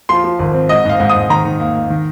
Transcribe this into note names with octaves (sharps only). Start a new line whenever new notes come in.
F3 C6
F3
G#1
C4
G#2 D#5
G#2 F5
G#2
D#6
G#2
D#3 A#5
D#3
A#3
A#3
D#3